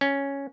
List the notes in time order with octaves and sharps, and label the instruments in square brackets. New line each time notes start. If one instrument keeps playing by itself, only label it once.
[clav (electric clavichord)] C#4